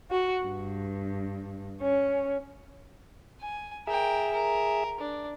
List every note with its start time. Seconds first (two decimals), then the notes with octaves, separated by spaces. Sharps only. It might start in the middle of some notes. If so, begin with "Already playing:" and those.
0.10 F#4
0.45 G2
1.81 C#4
3.41 G#5
3.87 G#4 A#4 E5 G5
4.33 A#4
5.00 D4